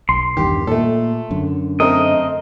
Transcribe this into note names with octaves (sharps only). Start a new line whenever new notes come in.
B1 C6
E2 G2 D#3 G4
A#2 A3 A4
F#2 D3
A3 C4 A#4 D#5